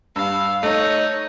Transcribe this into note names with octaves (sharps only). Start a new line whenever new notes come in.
G2 F5 E6
A3 D#4 C#5